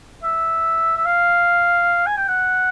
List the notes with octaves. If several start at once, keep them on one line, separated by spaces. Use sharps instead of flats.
E5
E5
F5
G#5
G5
F#5